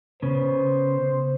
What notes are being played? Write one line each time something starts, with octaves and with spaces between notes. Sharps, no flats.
C#3 B3 C5